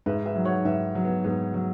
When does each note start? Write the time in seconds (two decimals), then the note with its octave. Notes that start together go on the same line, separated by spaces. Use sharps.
0.06 G#2 B4 E5
0.26 B4 E5
0.35 F#3
0.45 C#5 F#5
0.65 G#2 B4 E5
0.95 F#3
1.05 B3
1.24 G#2 B3
1.54 F#3